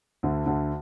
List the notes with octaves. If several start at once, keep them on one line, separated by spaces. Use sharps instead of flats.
D2 D3
D2 D3